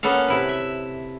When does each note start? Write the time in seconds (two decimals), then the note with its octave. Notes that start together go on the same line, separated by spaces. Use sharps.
0.03 A#3 B3 C#4 A4 F5
0.28 C3 E4 B4
0.49 E5